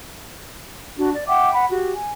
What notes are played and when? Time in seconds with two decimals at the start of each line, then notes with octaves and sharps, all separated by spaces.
0.97 D4 F#4
1.14 D5
1.28 E5 F#5 G5 D6
1.53 F#5 B5
1.70 F#4 G4
1.93 G#5